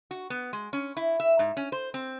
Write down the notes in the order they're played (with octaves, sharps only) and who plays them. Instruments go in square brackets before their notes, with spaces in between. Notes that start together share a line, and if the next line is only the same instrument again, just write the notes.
[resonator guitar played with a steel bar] F#4
B3
G#3
C#4
E4
E5
G#2
C#4
C5
C4